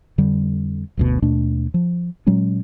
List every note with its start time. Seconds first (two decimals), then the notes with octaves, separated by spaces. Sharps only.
0.18 F2 D3 G3
0.97 F#1 D2 B2
1.22 D#2 B2 A3 D4
1.74 F3
2.27 A#2 F#3 G#3 C#4